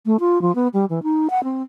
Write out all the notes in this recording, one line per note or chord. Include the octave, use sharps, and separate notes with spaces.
A3
F4
F3
B3
G3
E3
D#4
F#5
C4